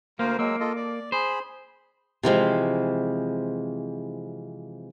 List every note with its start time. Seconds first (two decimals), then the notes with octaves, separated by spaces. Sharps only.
0.19 D2 A#3 C5 F5
0.39 F#3 G#3 A#3 E6
0.60 F4 A4 D#5
0.76 D5 D6
1.12 G#4 C5 B5
2.23 C3 E3 F3 G#3